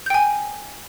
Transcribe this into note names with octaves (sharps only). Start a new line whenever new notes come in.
G5 G#5 G6